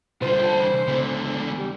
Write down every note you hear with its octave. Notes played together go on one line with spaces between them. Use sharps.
C2 D3 F4 C5
G5 A5
C3 E3
C#2 D3 B3 E4
G3